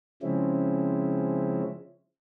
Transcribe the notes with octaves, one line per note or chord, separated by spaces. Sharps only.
C#3 F3 G#3 C4 C#4 E4